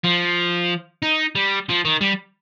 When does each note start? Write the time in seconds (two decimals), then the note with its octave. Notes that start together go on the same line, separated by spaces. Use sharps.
0.04 F3
1.02 D#4
1.35 G3
1.69 F3
1.85 D#3
2.01 G3